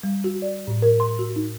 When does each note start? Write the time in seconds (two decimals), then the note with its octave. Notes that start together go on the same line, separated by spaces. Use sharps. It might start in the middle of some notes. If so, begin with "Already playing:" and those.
0.03 G3
0.24 F#4
0.42 D5
0.67 A2
0.82 A#4
1.00 C6
1.19 F#4
1.36 D#4